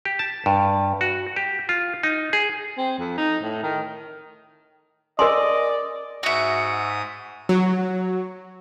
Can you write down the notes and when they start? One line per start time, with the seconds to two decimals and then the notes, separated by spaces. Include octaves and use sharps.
0.05 G4
0.19 A5
0.46 G2
1.01 F#4
1.36 G4
1.69 F4
2.03 D#4
2.33 G#4
2.78 C4
2.99 F2
3.18 D#4
3.43 A2
3.63 D#3
5.19 A#4 D5 D#5 G#5 C6
6.23 G#2 F#4 E5 D#6
7.49 F#3